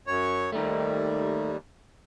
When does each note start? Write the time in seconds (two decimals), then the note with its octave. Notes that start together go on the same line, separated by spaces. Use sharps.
0.07 F#2 C#5
0.52 D#2 G3 A3 D#4